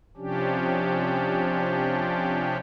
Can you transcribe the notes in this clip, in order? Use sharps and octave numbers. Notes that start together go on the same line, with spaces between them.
C3 F3 C#4 D4 G4